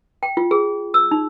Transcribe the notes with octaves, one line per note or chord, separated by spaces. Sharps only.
G5
F4
G#4
E6
D#4